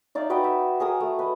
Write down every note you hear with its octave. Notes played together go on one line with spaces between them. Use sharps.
D#4 D5 E5 F5
F#4 B4 D#5 G5
E5
G#4 A#4 D#6
A3
B4 D#5